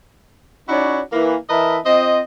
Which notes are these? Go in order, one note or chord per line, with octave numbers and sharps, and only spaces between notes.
C#4 D#4 E4 F#4 C#5 D5
E3 A#3 B4
E3 A#4 B4 D#5 E5 A5
C4 F4 C5 D#5